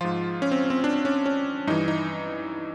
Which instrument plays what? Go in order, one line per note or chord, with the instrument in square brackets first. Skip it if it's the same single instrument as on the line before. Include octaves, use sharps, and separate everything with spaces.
[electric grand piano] G#2 F3 F4
C#4
C4
C4
D4
C#4
C#4
G2 E3 D#4
D#4